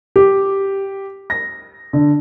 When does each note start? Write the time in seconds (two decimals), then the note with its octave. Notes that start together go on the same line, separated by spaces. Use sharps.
0.16 G4
1.30 A#6
1.93 D3